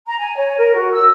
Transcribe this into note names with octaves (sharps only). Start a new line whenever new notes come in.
A#5
G#5
C#5
A#4
F#4
E6